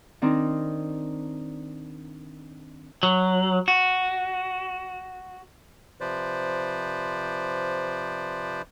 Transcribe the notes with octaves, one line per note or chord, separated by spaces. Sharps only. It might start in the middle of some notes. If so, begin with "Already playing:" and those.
D#3 C4 D4 D#4
F#3
F#4
C3 F3 B4 C5 D5